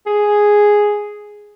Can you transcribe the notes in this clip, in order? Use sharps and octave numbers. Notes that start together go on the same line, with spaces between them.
G#4